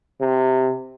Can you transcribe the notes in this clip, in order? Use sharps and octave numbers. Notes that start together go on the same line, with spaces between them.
C3